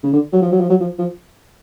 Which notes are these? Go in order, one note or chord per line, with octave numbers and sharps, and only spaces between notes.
C#3
D3
F#3
F3
F#3
F3
F#3
F3
F3